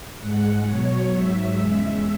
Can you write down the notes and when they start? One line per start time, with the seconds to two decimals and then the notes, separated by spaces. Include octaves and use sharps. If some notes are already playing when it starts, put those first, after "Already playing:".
0.19 G#2 G#3 F#5
0.65 B2 F#3 C#5
1.11 G#2 F#3 E5
1.57 E2 C#3 G#3